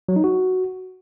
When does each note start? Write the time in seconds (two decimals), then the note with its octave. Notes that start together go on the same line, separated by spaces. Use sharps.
0.09 F#3
0.16 D#4
0.24 F#4